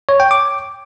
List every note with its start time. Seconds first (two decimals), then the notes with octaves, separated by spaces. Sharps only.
0.09 C#5
0.20 G5
0.31 D6